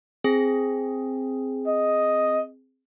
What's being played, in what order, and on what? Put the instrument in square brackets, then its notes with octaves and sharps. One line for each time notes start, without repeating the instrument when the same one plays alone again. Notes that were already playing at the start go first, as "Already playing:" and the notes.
[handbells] C4 G#4
[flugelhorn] D#5